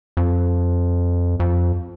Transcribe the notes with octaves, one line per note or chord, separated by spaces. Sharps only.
F2
F2